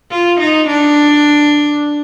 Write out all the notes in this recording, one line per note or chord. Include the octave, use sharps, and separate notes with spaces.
F4
D#4
D4